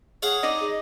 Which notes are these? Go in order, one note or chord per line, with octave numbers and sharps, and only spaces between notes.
G#4 C#5 F5 F#5
D#4 D5 D#5